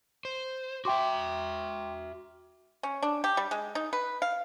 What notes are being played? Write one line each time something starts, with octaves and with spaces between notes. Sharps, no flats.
C5
F#4 E5 G5 C6 D6
C#4
D4
G4
G3
G#3
D#4
B4
F5